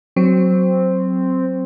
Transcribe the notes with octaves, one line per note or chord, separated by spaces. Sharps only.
F#3 C4